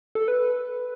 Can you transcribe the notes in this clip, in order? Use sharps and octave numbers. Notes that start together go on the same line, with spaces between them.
A4
B4